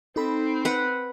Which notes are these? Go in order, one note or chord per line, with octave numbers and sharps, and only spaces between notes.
C4 D#4 A4 B5
B4 F#5